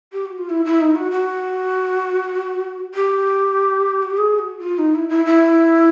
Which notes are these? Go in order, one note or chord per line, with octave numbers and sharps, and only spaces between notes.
G4
F#4
F4
E4
E4
D#4
F#4
F#4
G4
F#4
G4
G#4
F#4
F4
D#4
E4
E4
E4